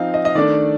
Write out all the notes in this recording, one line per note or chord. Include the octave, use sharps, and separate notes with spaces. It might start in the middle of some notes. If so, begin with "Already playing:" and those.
Already playing: F3 C4 D#4 F5
D#5
D#5
D#3 A3 D4 D5